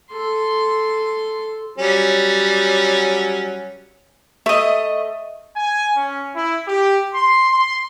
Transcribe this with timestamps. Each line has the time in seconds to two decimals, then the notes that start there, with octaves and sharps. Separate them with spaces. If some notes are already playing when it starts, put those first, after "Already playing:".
0.11 A4 C6
1.78 F#3 G3 C#4
4.46 A3 D#5 E5
5.56 G#5
5.96 C#4
6.35 E4
6.67 G4
7.14 C6
7.50 C6